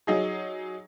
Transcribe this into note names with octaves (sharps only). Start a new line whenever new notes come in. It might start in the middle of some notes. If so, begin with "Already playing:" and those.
F#3 D#4 G#4